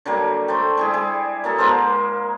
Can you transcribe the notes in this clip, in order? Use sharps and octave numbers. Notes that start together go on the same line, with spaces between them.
D3 F#3 G3 A#3
A3 C5 D5 G5
G3 E4 G#4
G3 G#4
F#3 A#3 A4
G#3 A#3 A#4 C5